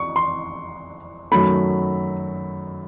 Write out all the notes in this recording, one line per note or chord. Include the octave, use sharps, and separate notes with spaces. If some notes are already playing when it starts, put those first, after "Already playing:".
Already playing: C#6
C6
F#2 D#3 F#3 A3 B5